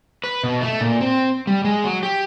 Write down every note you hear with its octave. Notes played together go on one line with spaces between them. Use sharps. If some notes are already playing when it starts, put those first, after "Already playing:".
B4
B2
A3
A#2
C4
G3
G#3
F#3
G4